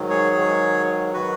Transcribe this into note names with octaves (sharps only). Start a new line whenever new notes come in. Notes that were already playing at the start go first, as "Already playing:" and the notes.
Already playing: G#2 D#3 F#3
G#4 C#5
G#2 D#3 F#3
D#3 F#3 F#4 B4